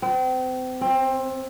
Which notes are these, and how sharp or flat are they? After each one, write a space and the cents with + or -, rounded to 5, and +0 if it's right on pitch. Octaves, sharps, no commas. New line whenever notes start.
C4 -35
C4 +20